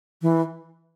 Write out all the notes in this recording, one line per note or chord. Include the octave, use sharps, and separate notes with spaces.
E3